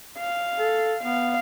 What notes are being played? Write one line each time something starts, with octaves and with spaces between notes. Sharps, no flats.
F5
A4
B3 F5